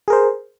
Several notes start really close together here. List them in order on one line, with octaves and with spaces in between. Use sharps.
G#4 A#4 C5